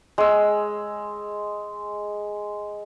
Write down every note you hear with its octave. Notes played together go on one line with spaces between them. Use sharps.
G#3 E6